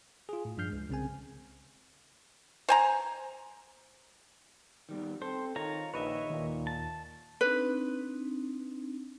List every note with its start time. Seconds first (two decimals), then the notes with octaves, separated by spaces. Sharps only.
0.29 F4 G#4
0.45 A2
0.57 G2 F3 D4 F6 G6 C7
0.70 C#2 G#3
0.89 C2 C#3 C4 G#4 G#5
2.69 C5 G#5 A#5
4.89 D#3 G3 B3
5.22 C4 A4 C5
5.56 D#3 F4 C#5 A#5
5.94 A#1 D#3 B4 C#5 D#5 E5
6.30 D#2 A#2
6.67 A5
7.41 C4 D4 D#4 B4